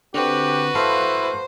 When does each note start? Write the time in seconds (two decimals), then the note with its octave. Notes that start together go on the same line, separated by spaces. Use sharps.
0.14 D3 C4 F#4 G4 B4
0.75 E4 A4 C5 F5 B5